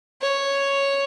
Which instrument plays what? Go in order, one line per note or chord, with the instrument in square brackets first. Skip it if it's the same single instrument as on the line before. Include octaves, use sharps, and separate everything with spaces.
[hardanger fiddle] C#5